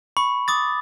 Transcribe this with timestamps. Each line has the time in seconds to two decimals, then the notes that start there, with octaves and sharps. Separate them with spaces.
0.17 B5 C#6
0.48 D6 D#6 A6